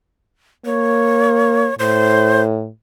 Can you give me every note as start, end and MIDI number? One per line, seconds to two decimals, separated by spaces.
0.66 1.69 58
0.66 1.74 73
1.79 2.69 45
1.79 2.42 72